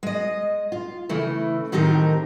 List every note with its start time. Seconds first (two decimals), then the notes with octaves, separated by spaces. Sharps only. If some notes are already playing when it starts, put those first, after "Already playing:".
0.03 G#3 D#5
0.72 F4
1.09 C#3 E3 A3 E4
1.72 A2 D#3 C4 D#4 G4 A#4